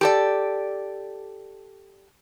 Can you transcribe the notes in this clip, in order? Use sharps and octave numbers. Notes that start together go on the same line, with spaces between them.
G4 A4 D5